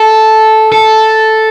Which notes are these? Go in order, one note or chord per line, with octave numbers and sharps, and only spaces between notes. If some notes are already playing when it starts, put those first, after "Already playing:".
Already playing: A4
A4